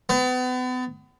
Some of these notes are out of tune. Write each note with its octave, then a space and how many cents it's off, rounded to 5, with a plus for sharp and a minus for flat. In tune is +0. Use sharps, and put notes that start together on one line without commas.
B3 +35